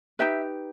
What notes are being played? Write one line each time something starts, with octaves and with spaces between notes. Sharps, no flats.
D#4 G4 B4 E5